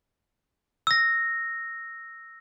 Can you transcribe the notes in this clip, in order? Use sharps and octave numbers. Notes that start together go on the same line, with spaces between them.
E6 A#6